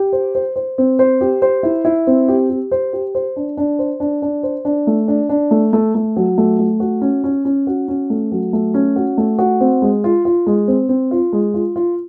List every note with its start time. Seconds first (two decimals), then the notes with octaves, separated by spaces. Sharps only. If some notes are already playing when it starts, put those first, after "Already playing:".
Already playing: G4
0.13 C5
0.35 C5
0.56 C5
0.78 C4
0.99 C5
1.21 G4
1.42 C5
1.63 E4
1.85 E4
2.07 C4
2.28 G4
2.49 G4
2.71 C5
2.93 G4
3.15 C5
3.36 D4
3.57 D4
3.79 C5
4.00 D4
4.22 D4
4.43 C5
4.65 D4
4.87 A3
5.08 D4
5.29 D4
5.51 A3
5.73 A3
5.95 A3
6.17 F#3
6.38 A3
6.59 A3
6.80 F#4
7.02 C#4
7.24 C#4
7.45 C#4
7.67 F#4
7.88 C#4
8.10 A3
8.32 F#3
8.53 A3
8.74 C#4
8.96 F#4
9.18 A3
9.39 F#4
9.61 C4
9.82 G#3
10.04 F4
10.25 F4
10.47 G#3
10.68 C4
10.89 C4
11.11 F4
11.33 G#3
11.54 F4
11.76 F4